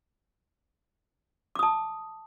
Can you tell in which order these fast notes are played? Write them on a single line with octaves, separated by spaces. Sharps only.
D6 D#6 A5